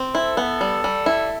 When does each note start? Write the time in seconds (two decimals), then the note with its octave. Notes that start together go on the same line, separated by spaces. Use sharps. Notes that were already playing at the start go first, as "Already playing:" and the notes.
Already playing: C4
0.15 E4 A4
0.37 B3
0.61 G3
0.84 G3
1.06 E4